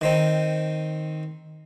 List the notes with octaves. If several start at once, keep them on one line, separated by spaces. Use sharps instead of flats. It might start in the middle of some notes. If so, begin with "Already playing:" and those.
D#3 C4 D#4